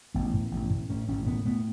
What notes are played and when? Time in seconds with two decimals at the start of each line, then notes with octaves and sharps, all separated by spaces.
0.14 A1 B3
0.33 A2
0.51 A1
0.70 A2
0.89 A2 C#4
1.08 A1 C#4
1.26 A2 B3
1.45 A2 B3